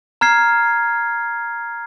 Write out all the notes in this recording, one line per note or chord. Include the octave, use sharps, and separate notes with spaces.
A#5 F6 G#6 C7